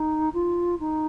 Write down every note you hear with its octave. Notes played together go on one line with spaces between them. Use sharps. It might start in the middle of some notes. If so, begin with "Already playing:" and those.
Already playing: D#4
F4
D#4